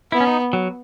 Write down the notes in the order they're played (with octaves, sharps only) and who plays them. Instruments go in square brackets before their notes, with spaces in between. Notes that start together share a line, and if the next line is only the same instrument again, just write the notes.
[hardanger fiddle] B3 [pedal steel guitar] E4
[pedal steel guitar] C#4
D#4
F#3